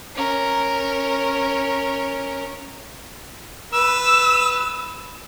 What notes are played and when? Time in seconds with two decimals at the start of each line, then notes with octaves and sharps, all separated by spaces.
0.15 C#4 A#4
3.73 B4 E6